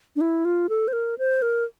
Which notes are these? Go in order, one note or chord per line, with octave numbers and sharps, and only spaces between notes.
D4
E4
F4
A4
C5
A#4
C5
A#4